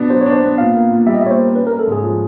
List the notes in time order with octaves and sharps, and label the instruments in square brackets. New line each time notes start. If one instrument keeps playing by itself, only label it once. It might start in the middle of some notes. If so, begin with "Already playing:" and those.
Already playing: [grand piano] B2 B3 D4
[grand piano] F#3 [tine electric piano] C5
[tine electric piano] C#5
[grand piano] D4
[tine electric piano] C5
[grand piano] B3
[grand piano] A#2 [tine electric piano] F5
[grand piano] A#3
A#2
[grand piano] G3 [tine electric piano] E5
[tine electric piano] D#5
E5
[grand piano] A#2 [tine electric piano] C#5
[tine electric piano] C5
[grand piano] A#3
[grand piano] C#4 [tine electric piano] B4
[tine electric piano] A#4
[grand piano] A3
[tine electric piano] A4
[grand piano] G#2 [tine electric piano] G#4
[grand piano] F3